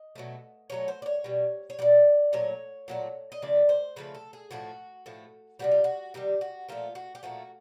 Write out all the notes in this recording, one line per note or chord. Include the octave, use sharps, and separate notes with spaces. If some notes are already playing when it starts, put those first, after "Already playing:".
Already playing: D#5
B2 F#3 A3
B2 F#3 A3 C#5
C5
D5
C#5
B2 G3
C#5
B2 G3 D5
A#2 F#3 A3 C#5
A#2 F#3 A3
D#5
C#3 F3 A3 D5
C5
C#3 F3 A3 B4
A4
G#4
A2 F3 A3 F#4
A2 F3 A3
C3 D#3 G3 F#4
F4
F#4
C3 D#3 G3 G4
F#4
A#2 F3 A3 F4
F#4
G4
A#2 F3 A3 F#4